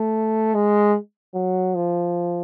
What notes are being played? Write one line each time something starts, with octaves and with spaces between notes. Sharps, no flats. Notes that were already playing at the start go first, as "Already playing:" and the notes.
Already playing: A3
G#3
F#3
F3